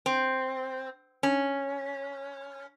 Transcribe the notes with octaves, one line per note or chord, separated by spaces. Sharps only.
C4
C#4